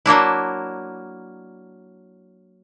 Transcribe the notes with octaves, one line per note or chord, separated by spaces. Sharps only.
F#3 A#3 D4 E4